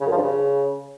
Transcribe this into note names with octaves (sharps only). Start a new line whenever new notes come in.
C#3
F#2
F3
G2
C#3